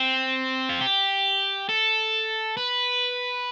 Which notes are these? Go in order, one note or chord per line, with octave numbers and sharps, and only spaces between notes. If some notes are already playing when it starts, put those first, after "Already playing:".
Already playing: C4
F4
G4
A4
B4